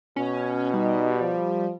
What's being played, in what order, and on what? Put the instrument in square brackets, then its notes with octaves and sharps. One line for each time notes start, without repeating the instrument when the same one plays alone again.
[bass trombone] B2 [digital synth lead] C#4
[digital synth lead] G3 [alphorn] D#4
[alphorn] F3